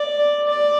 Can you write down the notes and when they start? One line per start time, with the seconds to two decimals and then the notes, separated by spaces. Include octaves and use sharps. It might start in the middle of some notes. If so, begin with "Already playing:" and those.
Already playing: D5
0.48 D5